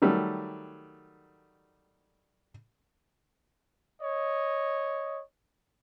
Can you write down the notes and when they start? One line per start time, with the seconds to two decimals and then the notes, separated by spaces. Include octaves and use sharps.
0.02 D#3 F#3 G3 A3
4.01 C#5 D#5